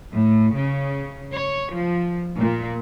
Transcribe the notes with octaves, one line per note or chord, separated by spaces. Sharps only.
A2
C#3
C#5
F3
A#2